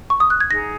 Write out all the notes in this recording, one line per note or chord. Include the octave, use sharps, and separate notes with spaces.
C#6
D#6
F#6
G#6
D#4 G#4 F#5 A#5 A#6